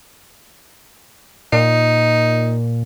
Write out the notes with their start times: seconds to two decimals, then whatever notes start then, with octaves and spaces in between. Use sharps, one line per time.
1.53 A#2 D#4